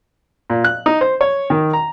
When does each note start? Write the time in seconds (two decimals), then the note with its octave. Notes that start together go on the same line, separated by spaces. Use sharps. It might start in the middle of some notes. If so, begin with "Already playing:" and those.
0.50 A#2
0.64 F#6
0.86 D#4
1.01 C5
1.21 C#5
1.50 D#3
1.73 A#5